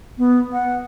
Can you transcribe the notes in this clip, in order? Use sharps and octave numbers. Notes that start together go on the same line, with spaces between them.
B3
F#5